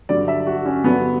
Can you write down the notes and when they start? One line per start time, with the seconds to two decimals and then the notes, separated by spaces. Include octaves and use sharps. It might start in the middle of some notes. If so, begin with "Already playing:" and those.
0.09 G2 D3 F#3 D5
0.28 E5
0.47 F#4
0.65 C#4
0.84 G2 D3 F#3 B3